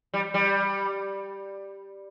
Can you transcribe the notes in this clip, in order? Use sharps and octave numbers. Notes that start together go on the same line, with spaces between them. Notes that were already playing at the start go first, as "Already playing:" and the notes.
G3
G3